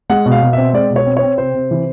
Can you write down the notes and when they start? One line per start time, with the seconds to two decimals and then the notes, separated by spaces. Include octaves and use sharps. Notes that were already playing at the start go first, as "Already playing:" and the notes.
0.10 G#3 F#5
0.26 B2
0.32 F5
0.42 B2
0.53 C4 E5
0.73 G#3 D5
0.90 B2
0.96 C#5
1.06 C4
1.17 C#5
1.23 C4
1.38 C3 C5
1.55 C3
1.71 E3